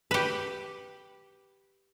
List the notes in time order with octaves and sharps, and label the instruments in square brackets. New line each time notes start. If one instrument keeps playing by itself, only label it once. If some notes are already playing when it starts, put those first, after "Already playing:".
[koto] G4 B4